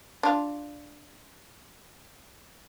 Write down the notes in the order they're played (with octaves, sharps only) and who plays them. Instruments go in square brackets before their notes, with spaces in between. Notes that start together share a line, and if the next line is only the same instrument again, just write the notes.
[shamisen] D4 F4